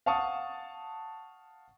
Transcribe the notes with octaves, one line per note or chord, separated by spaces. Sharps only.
F5 F#5 A5 C#6 D#6